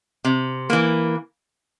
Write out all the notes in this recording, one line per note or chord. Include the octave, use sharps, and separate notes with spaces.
C3
E3 A#3